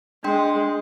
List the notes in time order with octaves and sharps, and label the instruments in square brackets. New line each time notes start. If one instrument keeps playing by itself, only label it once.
[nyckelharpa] G#3 [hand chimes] D4 G5 C6